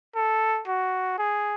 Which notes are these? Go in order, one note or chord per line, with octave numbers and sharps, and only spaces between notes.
A4
F#4
G#4